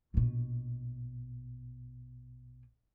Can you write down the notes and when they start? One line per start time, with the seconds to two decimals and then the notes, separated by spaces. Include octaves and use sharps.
0.14 A#1 B2